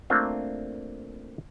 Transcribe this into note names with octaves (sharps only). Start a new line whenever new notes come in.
A3 A#3 C4 D4 F4